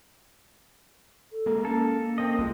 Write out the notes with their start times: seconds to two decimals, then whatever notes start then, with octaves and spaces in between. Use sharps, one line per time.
1.32 A4
1.46 G#3 A#3
1.65 A#3 C#4 A4
2.18 C4 A#4 D#5
2.39 C2 G#3 F4